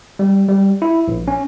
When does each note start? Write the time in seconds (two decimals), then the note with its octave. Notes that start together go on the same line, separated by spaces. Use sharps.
0.19 G3
0.49 G3
0.82 E4
1.08 A#1
1.28 C#4